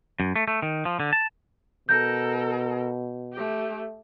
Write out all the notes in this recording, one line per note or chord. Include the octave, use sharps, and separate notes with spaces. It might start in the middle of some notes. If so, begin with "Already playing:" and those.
F#2
A3
A3
D#3
F3
D3
A5
B2 A4 A#4 G6 A#6
A3 G4